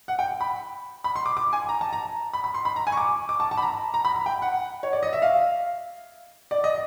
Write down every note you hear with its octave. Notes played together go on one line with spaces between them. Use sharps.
F#5
G5
B5
B5
C6
D6
D6
G#5
A#5
A5
A#5
B5
B5
C6
B5
A#5
G#5
C#6
D6
D6
A5
A5
B5
A#5
A#5
B5
B5
G5
F#5
C#5
D5
D#5
E5
F5
D5
D#5